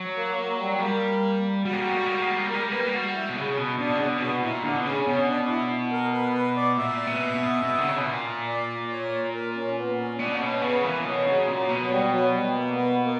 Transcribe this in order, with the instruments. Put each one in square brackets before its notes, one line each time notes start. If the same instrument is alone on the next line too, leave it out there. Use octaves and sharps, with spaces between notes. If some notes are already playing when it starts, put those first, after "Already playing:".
Already playing: [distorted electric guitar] F#3
[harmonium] A#3
A#3
G3
[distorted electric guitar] G3 [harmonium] A#3
[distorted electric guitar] G3 [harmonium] F#4
[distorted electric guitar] A#3
G3
A#3
G3
A#3
G3
A#3
G3
A#3
G3
[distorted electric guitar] A#3 [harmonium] A#4
[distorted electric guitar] G3
[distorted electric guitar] A#3 [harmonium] B4
[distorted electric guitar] G3
A#3
[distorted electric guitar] G3 [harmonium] F#4
[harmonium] E4
[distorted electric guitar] B2
C#3
B2
[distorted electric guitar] B2 [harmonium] D4
[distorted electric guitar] C#3
B2
C#3
[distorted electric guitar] B2 [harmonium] F#4
[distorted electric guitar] A#2 [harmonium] E4
[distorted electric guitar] D3 [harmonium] D4
[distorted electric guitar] B2
[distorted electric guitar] C#3 [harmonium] C#4
[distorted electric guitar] B2 [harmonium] C#4
[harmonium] D4
D4
E4
A#4
B4
B4
D5
[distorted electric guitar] A#2 [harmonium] E5
[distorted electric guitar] B2
B2
B2
D3
C#3
B2
A#2
[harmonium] D5
C#5
A#4
C#4
B3
C#4
[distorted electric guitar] B2 [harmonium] D4
[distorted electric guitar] C#3
[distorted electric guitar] B2 [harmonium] C#4
[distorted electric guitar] C#3 [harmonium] B3
[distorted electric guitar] E3 [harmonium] A#3
[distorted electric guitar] B2 [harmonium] F#3
[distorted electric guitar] C#3
A#2
B2
[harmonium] F#3
G3
F#3
G3
A#3
B3
A#3